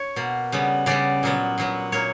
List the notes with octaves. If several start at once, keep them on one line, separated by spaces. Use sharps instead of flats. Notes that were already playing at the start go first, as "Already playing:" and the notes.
Already playing: C#5
B2 A#3
C#3 G3 B3
C#3 G3 B3 D5
A#2 F#3 B3
A#2 F#3 B3
A#2 A#3 C#5